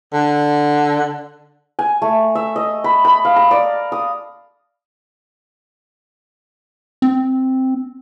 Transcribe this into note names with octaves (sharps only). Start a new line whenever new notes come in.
D3
G#5
A3
E5
D#5
B5
B5
F5
A#5
D5
D#6
C4